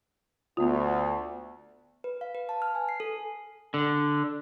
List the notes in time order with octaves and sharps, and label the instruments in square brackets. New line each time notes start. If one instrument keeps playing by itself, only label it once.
[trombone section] D2 [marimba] B3 F4
[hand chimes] B4
F5
B4
A5
F6
G#5
C7
A4
[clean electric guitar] D3